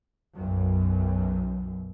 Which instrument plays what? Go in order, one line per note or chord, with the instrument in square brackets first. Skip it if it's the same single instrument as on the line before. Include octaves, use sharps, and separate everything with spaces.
[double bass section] B1 F#2